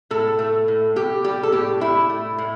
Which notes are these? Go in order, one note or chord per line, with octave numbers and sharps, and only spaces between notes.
A2 A4
A3
A2
A2 G4
G3 G4
A4
A2 G4
A2 E4
A3
A2